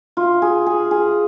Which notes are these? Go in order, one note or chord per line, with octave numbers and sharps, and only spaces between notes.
F4
G#4
G#4
G#4